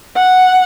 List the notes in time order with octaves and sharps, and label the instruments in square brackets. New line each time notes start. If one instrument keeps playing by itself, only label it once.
[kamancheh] F#5